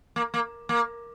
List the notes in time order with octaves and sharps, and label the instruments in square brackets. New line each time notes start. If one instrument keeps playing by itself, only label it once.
[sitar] A#3
A#3
A#3